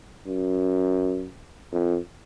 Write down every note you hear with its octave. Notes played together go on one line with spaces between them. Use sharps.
F#2
F2